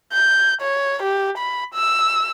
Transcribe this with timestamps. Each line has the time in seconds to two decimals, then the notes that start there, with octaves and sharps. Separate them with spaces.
0.13 G6
0.62 C#5
1.03 G4
1.39 B5
1.75 E6